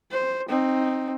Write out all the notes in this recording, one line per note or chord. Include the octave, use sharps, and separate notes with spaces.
C5
C4 D#4